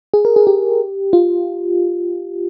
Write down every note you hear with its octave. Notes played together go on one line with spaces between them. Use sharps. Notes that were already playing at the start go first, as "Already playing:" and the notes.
G#4
A#4
G#4
G4
F4